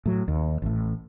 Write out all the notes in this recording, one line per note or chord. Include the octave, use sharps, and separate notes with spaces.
A2 F#3
D#2
A1 A2